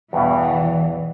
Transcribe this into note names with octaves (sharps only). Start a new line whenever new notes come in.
E2 G2 B2 E3